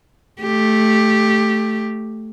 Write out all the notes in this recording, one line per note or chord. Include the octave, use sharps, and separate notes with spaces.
A3 G4